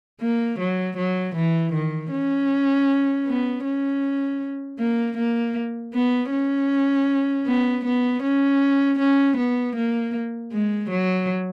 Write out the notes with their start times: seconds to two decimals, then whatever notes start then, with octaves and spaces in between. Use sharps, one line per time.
0.21 A#3
0.60 F#3
0.97 F#3
1.35 E3
1.73 D#3
2.12 C#4
3.26 B3
3.65 C#4
4.79 A#3
5.18 A#3
5.94 B3
6.31 C#4
7.46 B3
7.85 B3
8.23 C#4
8.99 C#4
9.37 B3
9.76 A#3
10.52 G#3
10.90 F#3